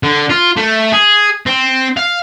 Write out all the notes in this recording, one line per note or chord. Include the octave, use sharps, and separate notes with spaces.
D3
F4
A3
G#4
C4
F5